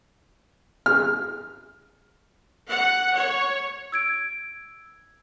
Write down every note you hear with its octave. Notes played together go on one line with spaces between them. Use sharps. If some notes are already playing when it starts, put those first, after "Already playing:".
F6
F#5
C#5
E6 G#6 D7